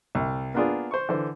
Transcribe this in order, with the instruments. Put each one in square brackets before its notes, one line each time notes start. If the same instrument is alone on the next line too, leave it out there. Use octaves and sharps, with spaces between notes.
[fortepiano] C2
A#3 B3 D4 F4 G#4
C5 C#6
D3 E3 C5